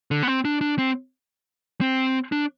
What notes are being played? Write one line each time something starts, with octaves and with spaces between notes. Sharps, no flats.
D3
B3
C4
D4
D4
C4
C4
D4